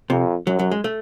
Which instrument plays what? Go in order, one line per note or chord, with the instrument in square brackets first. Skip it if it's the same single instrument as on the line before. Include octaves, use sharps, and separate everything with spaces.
[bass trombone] F2 [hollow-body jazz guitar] C3
[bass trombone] F#2 [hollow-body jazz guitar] F#3
[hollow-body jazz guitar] F#3
G#3
A3